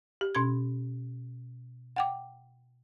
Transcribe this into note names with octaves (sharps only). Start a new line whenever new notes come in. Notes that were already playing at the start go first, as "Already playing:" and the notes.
G4
B2 C#4 C6 G#6
F#5 G5 D6